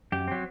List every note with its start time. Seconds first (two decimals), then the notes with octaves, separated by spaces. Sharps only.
0.12 F#2 G4
0.28 F#3 C4